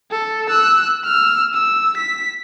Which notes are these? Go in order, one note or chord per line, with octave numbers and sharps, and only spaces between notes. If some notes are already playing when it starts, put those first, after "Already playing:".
A4
E6 F#6
E6 F6
E6
B6